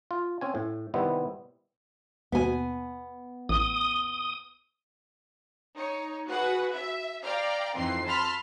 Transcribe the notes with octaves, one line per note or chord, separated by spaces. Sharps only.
F4
C4 C#4 G#5
A2
C3 D#3 G3 B3 C4 E4
D#2 B2 B3 G#5
A1 D#6
D#4 C#5
F#4 G#4 B4 F#5
E5
D5 F5 G5 A#5
F2 E3 C4 D#4 C6 C7
A5 B5 C6 E6 F6 B6